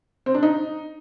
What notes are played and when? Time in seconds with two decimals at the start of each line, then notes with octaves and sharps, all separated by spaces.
0.26 C4
0.34 D4
0.43 D#4